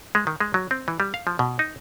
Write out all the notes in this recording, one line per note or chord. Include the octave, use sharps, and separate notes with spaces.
G#3
D#3
G#3
F#3
C4
E3
G3
F5
F3
B2
D#4